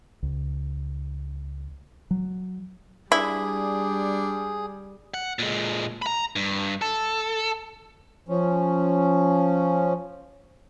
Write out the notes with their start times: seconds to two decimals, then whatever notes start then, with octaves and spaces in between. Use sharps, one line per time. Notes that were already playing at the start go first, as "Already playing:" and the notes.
0.23 C#2
2.11 F#3
3.12 G3 D4 E4 G#4
5.14 F#5
5.39 A#2 G#3
6.02 A#5 B5
6.36 G2
6.82 A4
8.29 F3 C#4